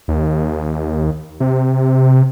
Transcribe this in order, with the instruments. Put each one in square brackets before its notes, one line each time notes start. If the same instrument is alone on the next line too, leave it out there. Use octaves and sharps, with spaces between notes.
[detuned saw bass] D#2
C3